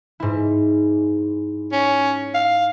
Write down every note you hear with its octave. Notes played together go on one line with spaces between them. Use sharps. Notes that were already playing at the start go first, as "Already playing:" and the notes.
G#2 E4
C#4
F5